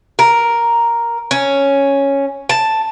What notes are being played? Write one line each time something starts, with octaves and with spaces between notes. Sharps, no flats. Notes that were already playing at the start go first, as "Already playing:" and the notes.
A#4
C#4
A5